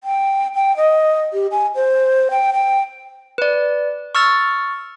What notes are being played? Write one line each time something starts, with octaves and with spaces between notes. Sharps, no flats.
G5
G5
D#5
G4
G#5
C5
G5
G5
B4 D5
C#6 E6 F6 A6